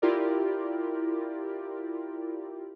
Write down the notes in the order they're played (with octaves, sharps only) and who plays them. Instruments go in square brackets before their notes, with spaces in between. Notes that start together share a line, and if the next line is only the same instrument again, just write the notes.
[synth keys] E4 F4 G4 A#4 D5